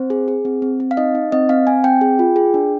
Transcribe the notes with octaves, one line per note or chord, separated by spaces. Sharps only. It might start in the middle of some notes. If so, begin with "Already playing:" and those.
Already playing: C4 C5
G#4
G#4
C4
C4
C4
F5
D#4 D#5
D#4
C4 D#5
C4 F5
C4 G#5
C4 G5
G#4
F4
G#4
D4